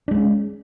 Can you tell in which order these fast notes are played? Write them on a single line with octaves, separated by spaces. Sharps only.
D4 G#3 C#4